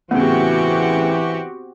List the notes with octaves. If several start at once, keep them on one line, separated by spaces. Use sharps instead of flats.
A2 C#3 E3 B3 C4 F#4 G4